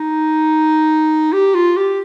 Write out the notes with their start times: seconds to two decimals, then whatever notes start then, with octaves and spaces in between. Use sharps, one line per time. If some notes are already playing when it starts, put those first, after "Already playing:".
Already playing: D#4
1.33 G4
1.55 F4
1.77 G4